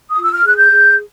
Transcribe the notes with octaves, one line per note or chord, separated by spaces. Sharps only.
D#6
F4
E6
F6
G#4 F#6
G6
G#4